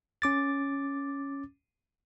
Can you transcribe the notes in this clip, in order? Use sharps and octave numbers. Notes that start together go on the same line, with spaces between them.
C#4 D6 A6